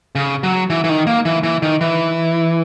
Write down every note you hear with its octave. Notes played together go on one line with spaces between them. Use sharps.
C#3
F#3
E3
E3
D#3
A#3
E3
E3
D#3
E3